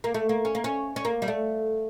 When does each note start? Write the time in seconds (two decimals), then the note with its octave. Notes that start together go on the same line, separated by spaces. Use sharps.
0.04 A#3
0.14 A3
0.29 A#3
0.45 C#4
0.55 A#3
0.64 C#4
0.96 C#4
1.05 A#3
1.22 G3
1.28 A3